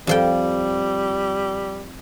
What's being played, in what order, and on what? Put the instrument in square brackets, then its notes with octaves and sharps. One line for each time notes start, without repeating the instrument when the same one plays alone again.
[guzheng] F2 F3 G5 [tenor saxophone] G3